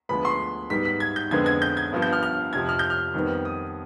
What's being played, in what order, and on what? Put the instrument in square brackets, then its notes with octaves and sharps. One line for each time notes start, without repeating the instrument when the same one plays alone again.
[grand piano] D2 D3 F3 G#3 B3 B5
C6
G#2 G3 B3 B6
B6
G#6
G6
F2 D3 G#3 B3 G#6
G#6
G6
G#6
G2 F3 B3
G6
F6
F6
F2 C3 F3 G#6
F6
G6
F6
F2 D#3 G3 B3
D#6